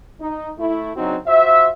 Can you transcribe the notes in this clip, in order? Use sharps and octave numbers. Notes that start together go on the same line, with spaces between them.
D#4
A3 E4
C#3 F#3 C4 D4 D#4 F#4
F4 F#4 C5 E5